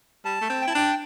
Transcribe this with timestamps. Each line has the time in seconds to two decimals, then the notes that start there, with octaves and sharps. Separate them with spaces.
0.25 G3 A5
0.41 A3
0.50 C4
0.62 G5
0.67 E4
0.70 A5
0.75 D4 G5